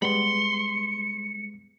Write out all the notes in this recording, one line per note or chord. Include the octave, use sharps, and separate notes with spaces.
G3 G#3 B3 B5 C6 C#7